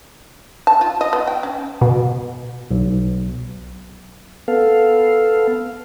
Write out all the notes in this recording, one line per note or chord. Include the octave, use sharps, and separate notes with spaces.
A5
F4
D#5
B3
G5
C#4
B2
B1
B3 A4 F5